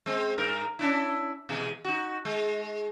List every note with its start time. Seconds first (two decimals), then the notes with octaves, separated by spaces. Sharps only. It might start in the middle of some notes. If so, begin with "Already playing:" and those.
0.06 G#3 C4
0.38 G2 A#4
0.79 C#4 D4 E4
1.49 B2 E3 G#3
1.85 D#4 F#4
2.25 G#3